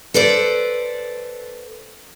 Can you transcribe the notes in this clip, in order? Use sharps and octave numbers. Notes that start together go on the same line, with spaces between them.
A4 B4 C5 D5